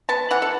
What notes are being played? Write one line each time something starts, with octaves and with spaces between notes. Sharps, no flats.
B3 A5
E3 F#5
A4